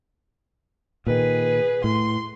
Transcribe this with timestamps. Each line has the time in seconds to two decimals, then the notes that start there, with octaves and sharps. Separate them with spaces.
1.07 A#2 D#3 G#4 B4
1.84 A2 C6